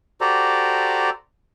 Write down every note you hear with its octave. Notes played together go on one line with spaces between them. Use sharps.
F#4 G4 A4 C5 D5 A#5